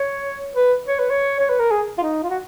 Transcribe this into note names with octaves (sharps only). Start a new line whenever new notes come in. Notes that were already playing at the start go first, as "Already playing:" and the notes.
Already playing: C#5
B4
C#5
B4
C#5
C#5
B4
A#4
G#4
F4
D#4
F4
F#4